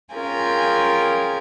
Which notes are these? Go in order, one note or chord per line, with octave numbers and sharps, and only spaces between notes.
C#4 F4 G#4 A#4 G5 G#5